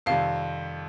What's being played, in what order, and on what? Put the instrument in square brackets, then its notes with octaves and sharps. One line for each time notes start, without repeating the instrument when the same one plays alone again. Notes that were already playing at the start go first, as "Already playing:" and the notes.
[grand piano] F2 C3 D#3 G3 [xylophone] F5